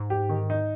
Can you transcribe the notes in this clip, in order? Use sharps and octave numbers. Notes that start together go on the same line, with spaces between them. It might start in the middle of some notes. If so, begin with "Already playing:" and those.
Already playing: G#2
G4
D#3
D#4